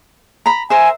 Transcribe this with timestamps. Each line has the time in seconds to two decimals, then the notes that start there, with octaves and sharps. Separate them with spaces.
0.46 A#5 B5
0.70 A#4 C5 E5 G#5